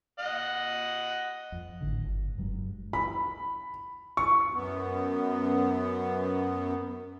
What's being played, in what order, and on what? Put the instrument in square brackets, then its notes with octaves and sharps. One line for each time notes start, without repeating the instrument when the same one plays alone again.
[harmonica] D#5 F#5
[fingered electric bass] F2
G#1 A2 D3
G1
F#1 G2 F#3 G#3
[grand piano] B5
C#6
[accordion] F#2 B3